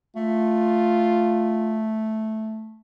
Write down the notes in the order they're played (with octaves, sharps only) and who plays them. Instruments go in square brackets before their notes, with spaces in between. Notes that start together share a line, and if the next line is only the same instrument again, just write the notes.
[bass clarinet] A3 [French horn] F4